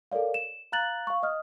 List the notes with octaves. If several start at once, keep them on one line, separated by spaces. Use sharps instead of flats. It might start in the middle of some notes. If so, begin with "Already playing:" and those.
A4 A#4 C#5 D5 F5
E7
F5 A#5 F#6 A6 F#7
F5 C#6
D#5 D#6 F6